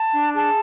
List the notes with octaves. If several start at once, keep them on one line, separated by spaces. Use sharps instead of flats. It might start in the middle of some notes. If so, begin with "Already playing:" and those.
Already playing: A5
D4
G#4 A5